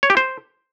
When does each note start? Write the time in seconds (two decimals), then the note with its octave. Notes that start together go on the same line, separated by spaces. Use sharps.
0.03 C#5
0.10 G4
0.17 C5